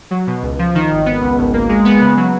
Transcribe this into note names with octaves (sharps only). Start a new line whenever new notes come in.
F#3
B2
C#2
F3
D#3
G#1
B3
C#2
G#1
A#3
G#3
B3
C#3
F#3